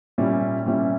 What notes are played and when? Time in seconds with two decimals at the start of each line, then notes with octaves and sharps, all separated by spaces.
0.18 A#2 G3 C#4 E4
0.66 A#2 G3 C#4 E4